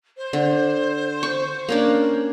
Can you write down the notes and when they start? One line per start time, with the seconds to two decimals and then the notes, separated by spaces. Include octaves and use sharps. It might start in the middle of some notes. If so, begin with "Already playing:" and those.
0.17 C5
0.33 D3
1.23 C#6
1.69 A#3 C#4 D4